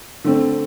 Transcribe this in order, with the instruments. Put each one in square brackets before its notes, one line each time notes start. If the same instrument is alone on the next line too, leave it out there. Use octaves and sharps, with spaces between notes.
[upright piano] D3 A3 C4